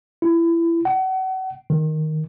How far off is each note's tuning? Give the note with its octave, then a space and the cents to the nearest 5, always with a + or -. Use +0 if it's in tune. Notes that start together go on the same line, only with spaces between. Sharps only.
E4 +25
F#5 +35
D#3 +0